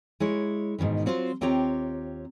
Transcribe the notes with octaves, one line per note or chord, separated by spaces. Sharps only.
G#3 E4 C#5
G#2 B2 D#3 E3
F#3 C4 F4 C5
D#2 C4 F4 G4 C#5 A#5